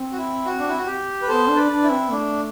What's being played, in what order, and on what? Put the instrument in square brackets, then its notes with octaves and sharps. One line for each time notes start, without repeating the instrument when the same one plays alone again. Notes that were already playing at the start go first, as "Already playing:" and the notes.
Already playing: [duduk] C4
[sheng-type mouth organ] F#4
E4
F#4
D4
E4
F#4
G4
B4
[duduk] B3 [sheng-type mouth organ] A4 C5
[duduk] D4
[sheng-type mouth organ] B4 D5
[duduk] D4
[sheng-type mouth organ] E4
[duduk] C4
[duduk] A3 [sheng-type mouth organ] D4